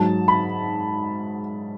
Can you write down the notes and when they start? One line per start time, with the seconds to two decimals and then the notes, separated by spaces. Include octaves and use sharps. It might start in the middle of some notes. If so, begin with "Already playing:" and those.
Already playing: G#2 F#3 A5
0.28 B5